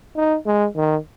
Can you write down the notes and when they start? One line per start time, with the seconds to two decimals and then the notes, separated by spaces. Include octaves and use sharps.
0.16 D#4
0.46 G#3
0.75 D#3